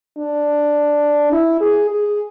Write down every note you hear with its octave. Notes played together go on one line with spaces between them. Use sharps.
D4
E4
G#4
G#4